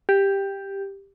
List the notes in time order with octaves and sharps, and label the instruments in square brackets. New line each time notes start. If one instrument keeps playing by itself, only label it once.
[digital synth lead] G4